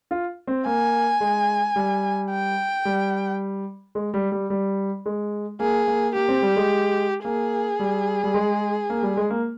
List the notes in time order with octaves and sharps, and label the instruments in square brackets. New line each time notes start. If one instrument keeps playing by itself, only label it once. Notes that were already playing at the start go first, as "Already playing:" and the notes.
[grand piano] F4
C4
[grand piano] A#3 [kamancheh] G#5
[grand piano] G#3
G3
[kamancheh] G5
[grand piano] G3
G#3
G3
G3
G3
G#3
[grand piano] A#3 [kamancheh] G#4
[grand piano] A#3
[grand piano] A#3 [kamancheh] G4
[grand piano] C4
G3
G#3
[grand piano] A#3 [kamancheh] G#4
[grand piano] G3
G3
G#3
A#3
G3
G#3
A#3